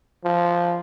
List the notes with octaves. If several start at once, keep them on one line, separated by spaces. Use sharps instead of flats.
F3